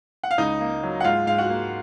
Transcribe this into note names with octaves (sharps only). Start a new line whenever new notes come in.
F#5
F5
C#2 D#4 D#5
A#3
F#3
F#5
G#2 F4 F5
G#2 F5
F#4 F#5
A#3